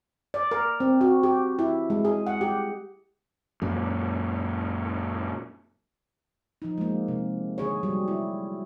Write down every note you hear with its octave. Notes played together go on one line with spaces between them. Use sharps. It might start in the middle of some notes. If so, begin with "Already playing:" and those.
D5
A#4
C4
F#4
G4
E4
G#3
G#4
F#5
G4
F#2 A#2
F3 D#4
G#3 A#3
C3
D3 G#4 C#5
F#3 G3
E4